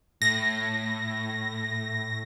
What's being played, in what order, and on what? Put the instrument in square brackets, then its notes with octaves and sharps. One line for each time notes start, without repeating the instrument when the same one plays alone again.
[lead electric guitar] A2 [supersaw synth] A#6